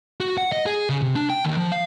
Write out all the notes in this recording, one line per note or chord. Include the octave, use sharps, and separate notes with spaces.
F#4
F#5
D#5
G#4
C#3
C3
D4
G5
D#2
F3
F5